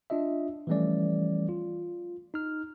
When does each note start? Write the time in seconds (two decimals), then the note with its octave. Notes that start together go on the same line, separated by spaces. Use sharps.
0.10 D4 F4 D#5 E5
0.67 E3 F3 G3 A3 C#4 D5
1.49 F4
2.34 D#4 F6